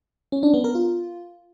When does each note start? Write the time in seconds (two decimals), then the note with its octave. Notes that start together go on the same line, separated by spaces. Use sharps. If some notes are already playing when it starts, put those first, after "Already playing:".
0.32 C#4
0.43 D4
0.54 B3
0.64 A#4
0.75 F4